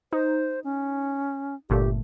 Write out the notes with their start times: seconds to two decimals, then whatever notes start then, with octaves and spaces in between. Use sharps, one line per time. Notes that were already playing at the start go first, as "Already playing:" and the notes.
0.13 D#4 C5
0.64 C#4
1.70 G1 A#2 A3 G4